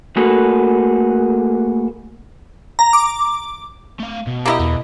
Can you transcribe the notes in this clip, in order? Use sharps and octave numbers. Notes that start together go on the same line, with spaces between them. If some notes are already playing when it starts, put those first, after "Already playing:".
A3 A#3 F#4 G#4 A4 B4
A#5
D6
A3 F5
B2
A#3 E4 G4 D#5
E2